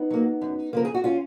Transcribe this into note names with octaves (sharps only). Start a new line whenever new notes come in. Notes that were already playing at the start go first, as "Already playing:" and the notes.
Already playing: B3 D#4
F#3 A#3
F#2
C#3 F3 A#3 A#4
G#4
F#4
C#4 F4